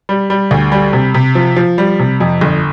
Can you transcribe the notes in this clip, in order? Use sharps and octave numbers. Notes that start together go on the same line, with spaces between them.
G3
G3
D2
G3
C3
C3
F3
F3
G3
C3
F2
G1